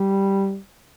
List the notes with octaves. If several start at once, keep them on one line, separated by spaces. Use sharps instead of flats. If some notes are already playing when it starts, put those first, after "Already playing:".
Already playing: G3